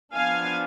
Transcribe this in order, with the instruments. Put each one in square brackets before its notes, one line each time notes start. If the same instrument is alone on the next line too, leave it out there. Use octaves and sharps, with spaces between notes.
[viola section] F3 B3 D4 F5 G#5